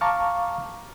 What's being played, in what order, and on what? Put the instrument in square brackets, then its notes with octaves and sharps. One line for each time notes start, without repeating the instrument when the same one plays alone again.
[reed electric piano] F5 A5 A#5 C#6 D6 F6